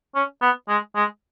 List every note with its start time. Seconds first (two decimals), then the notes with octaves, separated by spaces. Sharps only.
0.15 C#4
0.42 B3
0.69 G#3
0.96 G#3